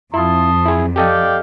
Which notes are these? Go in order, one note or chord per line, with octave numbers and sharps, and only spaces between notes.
F2 E4 F4 A5 C6 D#6
E4 G#4
G4 A4 D5 D#5 F5 G5